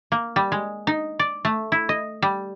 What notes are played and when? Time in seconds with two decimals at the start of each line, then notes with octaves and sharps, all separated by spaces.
0.12 A#3
0.36 G3
0.52 G#3
0.87 D#4
1.19 D5
1.45 A3
1.72 E4
1.89 D#5
2.22 G3